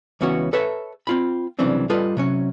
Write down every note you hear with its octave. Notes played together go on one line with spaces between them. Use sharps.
C#2 E3 B3 C#4 F#4 C#5
A4 B4 C#5 E5 A5
C4 F4 B5
C2 C#3 E3 F#3 C4 D4
G3 F4 A4 B4 D#5
C3 F#3 C#4